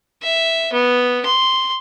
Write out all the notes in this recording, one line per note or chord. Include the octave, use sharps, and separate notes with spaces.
E5
B3
C6